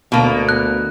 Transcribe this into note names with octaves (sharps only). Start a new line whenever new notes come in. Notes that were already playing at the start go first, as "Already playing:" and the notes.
D2 B2 A#3
F#6